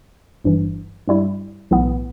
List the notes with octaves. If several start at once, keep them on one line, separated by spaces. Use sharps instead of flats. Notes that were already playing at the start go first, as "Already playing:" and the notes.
G1 G2 E3
G2 G3 E4
B1 A2 E3 B3